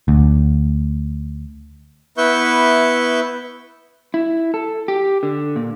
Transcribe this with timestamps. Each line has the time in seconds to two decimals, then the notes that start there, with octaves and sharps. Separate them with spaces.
0.08 D2
2.17 B3 E4 B4 E5 C#6 G6
4.14 E4
4.54 A4
4.88 G4
5.23 D3
5.56 A#2